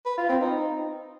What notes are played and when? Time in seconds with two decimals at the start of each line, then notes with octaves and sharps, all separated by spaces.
0.06 B4
0.17 F4
0.29 C4
0.41 D#4